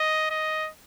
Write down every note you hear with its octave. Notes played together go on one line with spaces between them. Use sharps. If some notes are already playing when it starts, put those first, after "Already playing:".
Already playing: D#5
D#5